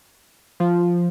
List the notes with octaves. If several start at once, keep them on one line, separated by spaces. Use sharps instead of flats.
F3